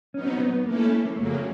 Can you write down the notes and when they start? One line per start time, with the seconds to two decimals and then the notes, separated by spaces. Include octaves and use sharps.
0.14 F#3 B3 C#4 D#4
0.27 C4
0.40 B3
0.53 B3
0.66 A3 A#3 C#4 E4 A4
1.06 A#3
1.16 F2 C#3 F#3 A3 A#3